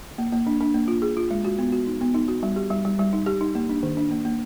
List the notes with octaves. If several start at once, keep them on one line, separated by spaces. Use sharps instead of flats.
A#3
A#3
D4
D4
A#3
F4
G#4
F4
G#3
F#4
B3
F#4
D#4
B3
D#4
F#4
G3
G4
G3
G3
G3
D#4
G4
D#4
A#3
D4
D#3
D4
A#3
A#3